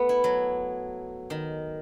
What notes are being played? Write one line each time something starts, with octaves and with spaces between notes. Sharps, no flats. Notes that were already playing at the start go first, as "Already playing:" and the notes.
Already playing: A3 B3
E4
F#3
D#3